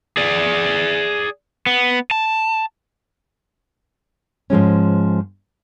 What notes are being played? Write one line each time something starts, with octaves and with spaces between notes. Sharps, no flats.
G#4 D5
B3
A5
G#2 F3 G#3 C#4